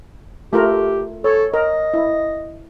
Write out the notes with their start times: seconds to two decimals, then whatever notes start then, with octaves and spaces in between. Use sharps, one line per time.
0.53 A3 F4 G4 A#4
1.24 A4 C#5
1.54 A#4 D#5
1.94 E4